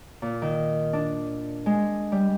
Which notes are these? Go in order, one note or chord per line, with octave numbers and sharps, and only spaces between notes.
A#2
D#3
D4
G#3
G3